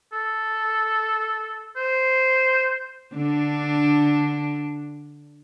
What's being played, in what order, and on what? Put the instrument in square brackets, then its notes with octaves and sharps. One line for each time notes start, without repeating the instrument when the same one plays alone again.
[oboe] A4
C5
[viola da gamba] D3 D4